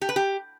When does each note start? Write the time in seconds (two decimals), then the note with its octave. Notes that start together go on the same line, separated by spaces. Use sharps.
0.02 G4
0.09 B4
0.16 G4